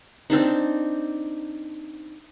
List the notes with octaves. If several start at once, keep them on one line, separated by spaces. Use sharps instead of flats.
C4 D4 D#4